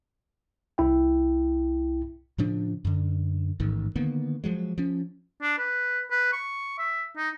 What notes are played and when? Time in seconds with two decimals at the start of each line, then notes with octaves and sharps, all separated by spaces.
0.78 C2 E4 G5
2.38 A2 C#3 F3 D4
2.85 F#2 D3
3.60 A1 G#2 D#3
3.95 D3 D#3 A#3 B3
4.44 F3 F#3 G#3
4.78 F3 C#4
5.42 D4
5.58 B4
6.11 B4
6.33 C#6
6.79 E5
7.17 D#4